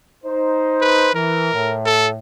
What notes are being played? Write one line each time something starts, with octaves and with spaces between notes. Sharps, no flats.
D#4 C5
B4
E3 A#4
A2
A4